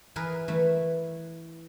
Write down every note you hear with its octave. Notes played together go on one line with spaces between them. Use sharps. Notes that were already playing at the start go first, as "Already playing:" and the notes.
E3 G#4 A#4 B4
E3 A3